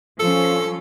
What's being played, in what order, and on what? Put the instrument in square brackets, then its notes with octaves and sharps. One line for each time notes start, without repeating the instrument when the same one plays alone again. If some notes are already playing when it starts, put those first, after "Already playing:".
[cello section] F3 C#4 [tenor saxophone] A4